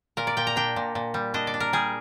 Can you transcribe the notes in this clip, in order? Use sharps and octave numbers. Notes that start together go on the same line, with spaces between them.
A#2 A#4
D5
A#2 G5
A#5
D4 G5
A#2
A#2
G3
D4 D#5
D5
D4
A#4
G3 G#4